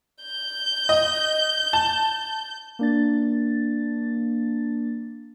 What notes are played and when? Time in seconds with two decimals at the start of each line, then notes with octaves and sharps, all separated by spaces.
0.23 G6
0.89 D#5
1.73 A5
2.79 A#3 D4 A6